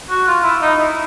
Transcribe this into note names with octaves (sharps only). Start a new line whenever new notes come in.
F#4
F4
E4
D#4
E4